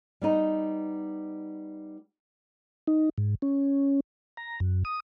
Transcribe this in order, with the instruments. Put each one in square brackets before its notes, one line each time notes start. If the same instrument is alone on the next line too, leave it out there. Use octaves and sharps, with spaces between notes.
[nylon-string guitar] G3 B3 D#4
[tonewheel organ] D#4
G#2
C#4
A#5
F#2
D#6